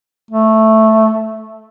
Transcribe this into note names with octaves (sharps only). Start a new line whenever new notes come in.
A3